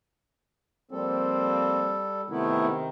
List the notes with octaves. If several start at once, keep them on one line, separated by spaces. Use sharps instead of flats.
F3 G3 A#3 C4 A4
C3 D#3 A3 B3 E4